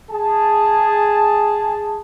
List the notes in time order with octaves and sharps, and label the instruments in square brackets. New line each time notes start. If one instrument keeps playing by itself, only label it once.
[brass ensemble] G#4 A5